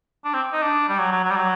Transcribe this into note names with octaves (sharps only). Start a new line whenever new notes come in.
D4
C4
D#4
D4
G3
F#3
F#3
F#3
G3
F#3